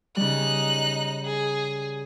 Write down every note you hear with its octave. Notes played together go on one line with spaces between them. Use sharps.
C#3 G3 D#4 F#6
G#4